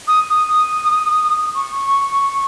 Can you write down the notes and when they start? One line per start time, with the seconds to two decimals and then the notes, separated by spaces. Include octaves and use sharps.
0.08 D#6
0.30 D#6
1.55 C#6